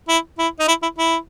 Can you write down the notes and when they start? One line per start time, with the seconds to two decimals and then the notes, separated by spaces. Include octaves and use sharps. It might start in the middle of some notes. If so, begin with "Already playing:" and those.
0.09 E4
0.39 E4
0.60 D#4
0.68 E4
0.83 E4
0.98 E4